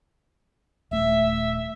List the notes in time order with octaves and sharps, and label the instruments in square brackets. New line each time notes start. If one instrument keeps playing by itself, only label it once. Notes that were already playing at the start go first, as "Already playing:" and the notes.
[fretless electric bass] D#1 A3 [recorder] E5